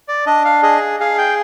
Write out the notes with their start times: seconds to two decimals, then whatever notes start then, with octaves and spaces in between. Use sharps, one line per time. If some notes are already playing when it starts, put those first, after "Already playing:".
0.08 D5
0.26 D4 D#5
0.45 F5
0.63 G#4 D#5
1.00 G#4 F5
1.18 G5